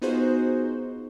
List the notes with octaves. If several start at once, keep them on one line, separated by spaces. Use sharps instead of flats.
B3 D#4 F4 F#4 G#4 C5